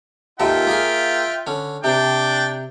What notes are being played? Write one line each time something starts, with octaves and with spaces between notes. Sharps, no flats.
D#2 A#2 F4 A4 E5 G5
A#3 G#4 G#5
D3 C#4
C3 D4 G5